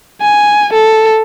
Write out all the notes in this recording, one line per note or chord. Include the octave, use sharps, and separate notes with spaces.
G#5
A4